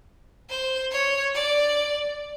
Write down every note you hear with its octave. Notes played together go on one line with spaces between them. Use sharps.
C5
C#5
D5